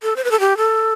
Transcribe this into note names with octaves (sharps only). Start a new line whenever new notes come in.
A4
C5
B4
A4
G4
A4